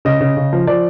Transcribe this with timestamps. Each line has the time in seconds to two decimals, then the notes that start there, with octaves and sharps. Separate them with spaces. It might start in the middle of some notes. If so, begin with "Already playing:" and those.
0.05 C#3 D#5
0.21 C#3
0.37 C#3
0.53 F3
0.67 F3 D5